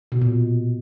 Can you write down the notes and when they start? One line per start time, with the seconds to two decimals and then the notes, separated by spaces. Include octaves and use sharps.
0.12 B2
0.21 A#2